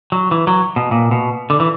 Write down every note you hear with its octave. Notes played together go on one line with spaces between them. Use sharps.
F#3
E3
F#3
B2
A#2
B2
D3
E3